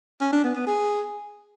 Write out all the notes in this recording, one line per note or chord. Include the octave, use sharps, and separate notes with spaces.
C#4
D4
B3
B3
G#4